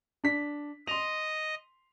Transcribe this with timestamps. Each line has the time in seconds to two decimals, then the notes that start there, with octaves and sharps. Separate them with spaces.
0.24 D4 B6
0.87 D#5 C6 F7